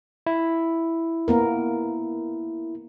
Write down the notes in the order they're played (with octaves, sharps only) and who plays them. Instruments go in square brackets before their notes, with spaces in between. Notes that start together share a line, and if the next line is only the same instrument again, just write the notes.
[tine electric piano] E4
[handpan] A#3 B3 A#4